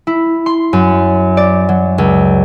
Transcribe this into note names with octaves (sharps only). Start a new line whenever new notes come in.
E4
C6
F#2
D5
F#3
C#2